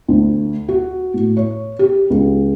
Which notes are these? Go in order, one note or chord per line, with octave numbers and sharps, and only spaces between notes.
D2
F#4
A2
C#5
G4
C#2